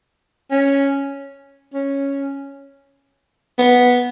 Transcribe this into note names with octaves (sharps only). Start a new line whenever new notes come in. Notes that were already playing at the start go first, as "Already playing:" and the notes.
C#4
C#4
B3